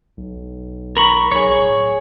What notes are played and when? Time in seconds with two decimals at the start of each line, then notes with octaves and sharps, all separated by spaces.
0.17 B1
0.97 A#4 B5 C#6
1.32 B1 G#4 C#5
1.56 D1